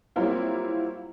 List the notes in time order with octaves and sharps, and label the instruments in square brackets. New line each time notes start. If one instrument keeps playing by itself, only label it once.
[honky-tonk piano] F#3 G3 A#3 C4 E4 F4